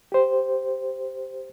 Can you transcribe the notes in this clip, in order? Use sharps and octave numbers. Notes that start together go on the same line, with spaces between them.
G4 C5